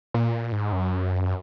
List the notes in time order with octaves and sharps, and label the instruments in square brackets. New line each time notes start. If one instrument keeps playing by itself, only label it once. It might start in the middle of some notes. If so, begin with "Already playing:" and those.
[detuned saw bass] A#2
G#2
F#2